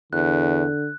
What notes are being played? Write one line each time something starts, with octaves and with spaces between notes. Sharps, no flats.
E2 D3 F#6